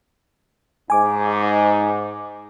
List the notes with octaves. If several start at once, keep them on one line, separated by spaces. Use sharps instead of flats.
G#2 G#5 D6